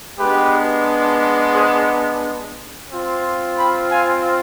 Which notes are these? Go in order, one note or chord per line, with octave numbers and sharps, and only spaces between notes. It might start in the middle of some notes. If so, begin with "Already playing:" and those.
G#3 B3 D4 G4 B4
G#4 C5
C4 F4
G5 B5
F5 G#5